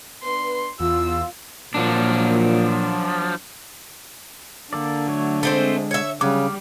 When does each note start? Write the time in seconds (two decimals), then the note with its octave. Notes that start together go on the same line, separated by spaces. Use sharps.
0.23 B3 D4 B4 C6
0.80 E2 F4 E6
1.74 A#2 F3 F#3 D4
4.73 D3 A#3 A4 D5
5.08 F#3 A3 C#5
5.43 G#3 A3 C4 C5
5.91 C#5 E5
6.21 C#3 F#3 G3 D6 F6